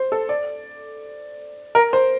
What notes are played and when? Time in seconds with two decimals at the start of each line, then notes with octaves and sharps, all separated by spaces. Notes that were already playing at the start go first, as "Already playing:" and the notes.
Already playing: C5
0.12 A4
0.29 D5
1.75 A#4
1.93 C5